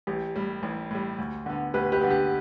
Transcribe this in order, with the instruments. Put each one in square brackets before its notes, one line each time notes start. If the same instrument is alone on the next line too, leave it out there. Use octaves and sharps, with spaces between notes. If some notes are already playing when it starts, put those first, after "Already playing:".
[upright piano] A1 [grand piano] G4
[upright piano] A2 G3
A1
A2 G3
D2
D3 B3
[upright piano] D2 [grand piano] G4 B4
[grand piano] G4 B4
[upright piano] D3 B3
[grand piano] G4